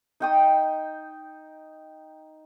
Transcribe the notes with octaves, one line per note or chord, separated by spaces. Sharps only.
D#4 G5 D#6